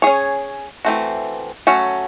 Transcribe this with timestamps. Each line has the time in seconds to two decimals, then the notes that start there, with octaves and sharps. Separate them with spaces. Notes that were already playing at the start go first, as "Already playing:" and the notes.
0.02 C#4 G#4 C#5
0.85 E3 A3 C4 F#4
1.67 F#3 A3 C#4 F#4